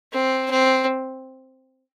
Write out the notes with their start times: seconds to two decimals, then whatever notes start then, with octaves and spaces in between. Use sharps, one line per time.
0.12 C4
0.51 C4